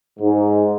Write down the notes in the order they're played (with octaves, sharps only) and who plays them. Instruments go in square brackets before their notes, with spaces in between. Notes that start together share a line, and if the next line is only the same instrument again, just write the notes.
[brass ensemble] G#2